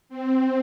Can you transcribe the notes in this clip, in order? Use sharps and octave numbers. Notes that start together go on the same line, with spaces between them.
C4